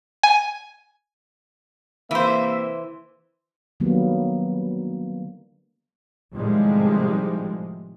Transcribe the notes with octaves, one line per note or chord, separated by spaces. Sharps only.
G#5
C3 E3 A#3 C5 E5
D3 D#3 F#3 G3 A#3 B3
A2 C3 D#3 F3 G3 G#3